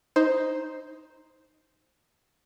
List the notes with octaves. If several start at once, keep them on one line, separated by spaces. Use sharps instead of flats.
D#4 C5